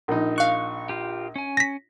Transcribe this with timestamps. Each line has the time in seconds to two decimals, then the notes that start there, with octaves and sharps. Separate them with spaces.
0.08 A#1 D#4
0.38 F5 C#6 F#6
0.89 F4 G4
1.36 C#4 G#5
1.57 A#6 B6